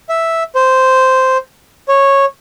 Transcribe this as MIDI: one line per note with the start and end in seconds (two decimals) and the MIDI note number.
0.09 0.43 76
0.55 1.37 72
1.88 2.25 73